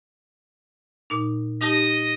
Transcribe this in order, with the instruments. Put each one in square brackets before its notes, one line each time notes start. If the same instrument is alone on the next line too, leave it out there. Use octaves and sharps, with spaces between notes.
[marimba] A#2 D#4
[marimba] D#4 G4 A5 [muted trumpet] D#5